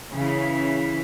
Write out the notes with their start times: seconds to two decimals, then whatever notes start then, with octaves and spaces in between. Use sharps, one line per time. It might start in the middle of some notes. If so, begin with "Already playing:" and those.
0.12 C#3 E3 C#4 E4